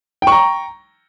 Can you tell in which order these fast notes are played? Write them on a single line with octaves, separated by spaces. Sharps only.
G5 C#6 A#5